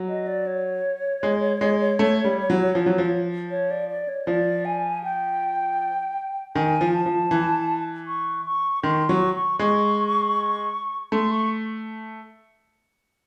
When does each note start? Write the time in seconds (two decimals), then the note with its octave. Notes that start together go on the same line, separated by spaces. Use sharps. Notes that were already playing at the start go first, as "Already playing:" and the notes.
Already playing: F#3
0.09 D#5
0.27 D5
0.47 C#5
1.23 G#3
1.61 G#3
1.99 A3
2.25 G3
2.50 F#3
2.75 F3
2.86 F#3
2.98 F3
3.51 C#5
3.71 D5
3.90 D5
4.08 C#5
4.27 F3 D5
4.65 G#5
5.04 G5
6.55 D#3 G#5
6.81 F3
6.93 A5
7.06 F3
7.31 E3
8.07 C#6
8.46 C#6
8.83 D#3 C6
9.09 F#3 C#6
9.35 C#6
9.59 G#3 C#6
11.12 A3 C6
11.31 C#6